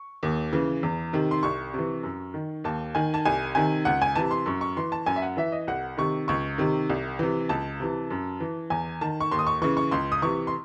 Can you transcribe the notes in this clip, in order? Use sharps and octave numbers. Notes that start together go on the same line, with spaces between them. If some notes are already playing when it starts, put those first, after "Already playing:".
Already playing: C#6
D#2
C#3 E3
E2
C3 D#3
C6
C2 C#6
C3 E3
F#2
D#3
D#2 A5
D#3 G#5
A5
C2 G#5
C3 D#3 G#5
C#2 F#5
G#5
C3 E3 A5
C6
F#2 C#6
C#6
E3 C6
A5
F#2 G#5
E5
F#5
E3 E5
D#5
C2 F#5
C3 D#3 C#6
C#2 C#6
C3 D#3
C2
C3 E3
C#2 A5
C3 E3
F#2
E3
E2 G#5
D#3 A5
C#6
D#2 C6
D#6
C#6
C#3 E3 C#6
C#6
C#2 C6
D#6
C3 E3 C#6
C6